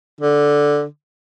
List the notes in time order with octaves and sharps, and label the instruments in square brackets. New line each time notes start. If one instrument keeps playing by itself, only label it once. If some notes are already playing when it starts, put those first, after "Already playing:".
[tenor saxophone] D3